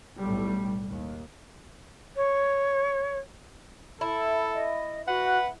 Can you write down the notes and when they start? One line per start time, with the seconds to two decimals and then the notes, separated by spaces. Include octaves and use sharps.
0.19 B1 A2 G3
0.88 D#2
2.16 C#5
4.01 E4 A4
4.54 D#5
5.08 F#4 B4 F#5